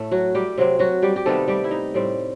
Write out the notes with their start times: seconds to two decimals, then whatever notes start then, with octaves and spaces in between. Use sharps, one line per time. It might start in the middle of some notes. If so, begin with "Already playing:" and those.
Already playing: A2 A3
0.11 F#3 F#4
0.35 G3 G4
0.58 C3 F#3 C4
0.79 F#3 F#4
1.02 G3 G4
1.16 G4
1.26 C3 D#3 G3 A3 B3 A4
1.48 G3 G4
1.64 E4
1.71 D#4
1.94 A2 G3 C4